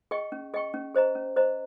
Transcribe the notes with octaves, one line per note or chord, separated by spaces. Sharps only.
G#4 D#5 G5 C#6
C#4
G#4 D#5 G5 C#6
C#4
G#4 C5 D#5 A#5
C#4
G#4 C5 D#5 A#5